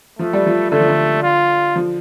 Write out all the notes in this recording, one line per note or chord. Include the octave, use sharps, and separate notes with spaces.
F3 A3
G3
F3
D3 A3
F3
D3
F4
F3